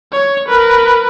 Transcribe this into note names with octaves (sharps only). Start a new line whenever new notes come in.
C#5
A#4 B4